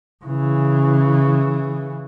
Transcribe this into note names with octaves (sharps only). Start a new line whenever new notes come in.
C#3 E3